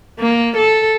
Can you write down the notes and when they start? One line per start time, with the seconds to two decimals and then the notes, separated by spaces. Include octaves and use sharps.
0.20 A#3
0.57 A4